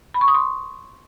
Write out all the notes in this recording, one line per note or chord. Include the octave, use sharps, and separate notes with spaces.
B5
C#6
D#6
C6